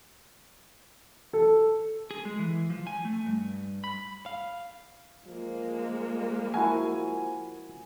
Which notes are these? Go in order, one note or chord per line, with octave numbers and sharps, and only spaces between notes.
A4
G#4
G#3
E3
F3
G#5
A3
G2
B5
F5
F3 G#3 A#3
F3 E4 F#4 A#4 G#5